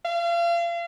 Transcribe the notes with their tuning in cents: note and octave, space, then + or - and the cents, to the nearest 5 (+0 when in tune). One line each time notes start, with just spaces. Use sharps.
F5 -35